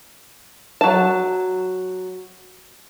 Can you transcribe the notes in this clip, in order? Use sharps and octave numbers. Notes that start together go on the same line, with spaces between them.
F#3 A5